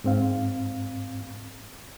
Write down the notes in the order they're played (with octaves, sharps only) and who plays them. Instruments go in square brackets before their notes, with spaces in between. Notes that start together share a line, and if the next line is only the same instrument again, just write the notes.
[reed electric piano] G#2 C4 F5